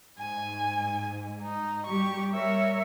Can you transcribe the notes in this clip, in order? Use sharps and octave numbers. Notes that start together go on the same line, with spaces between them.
G#2 G#5
D#4
G3 G4 C#6
G3 A#4 C#5 E5